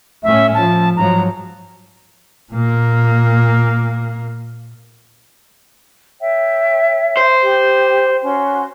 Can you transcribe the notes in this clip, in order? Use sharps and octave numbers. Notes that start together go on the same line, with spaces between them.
A2 A3 C#4 E5
F3 A5
G#2 F3 F#3 A#5
A#2 A#3
C#5 E5 G5
C5
G4
C#4 F#4 C6